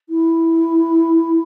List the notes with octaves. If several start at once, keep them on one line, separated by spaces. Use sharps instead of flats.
E4